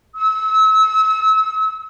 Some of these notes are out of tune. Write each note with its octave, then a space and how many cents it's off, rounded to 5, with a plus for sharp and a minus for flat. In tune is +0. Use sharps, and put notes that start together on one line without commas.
E6 -35